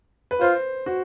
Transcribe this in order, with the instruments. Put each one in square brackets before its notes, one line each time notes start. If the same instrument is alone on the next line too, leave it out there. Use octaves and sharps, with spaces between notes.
[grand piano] B4
[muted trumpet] F4 [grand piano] C5
[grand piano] F#4